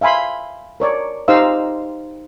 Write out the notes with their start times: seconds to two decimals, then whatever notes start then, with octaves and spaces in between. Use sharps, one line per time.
0.01 E5 F5 G#5 B5 C6
0.80 A#4 C#5 D5
1.28 D#4 G4 C5 D#5 F5 E6